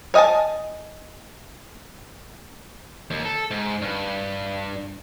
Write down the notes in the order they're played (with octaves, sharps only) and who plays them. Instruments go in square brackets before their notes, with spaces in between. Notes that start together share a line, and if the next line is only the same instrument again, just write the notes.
[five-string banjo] C#5 D#5 F5 G#5 A5
[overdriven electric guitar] D#2
A4
G#2
G2